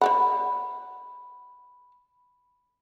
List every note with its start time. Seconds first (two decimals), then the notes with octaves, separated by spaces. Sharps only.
0.01 C5 D5 F#5 B5